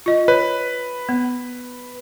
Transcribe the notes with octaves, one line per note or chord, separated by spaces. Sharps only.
F4 D#5
B4 C#5
B3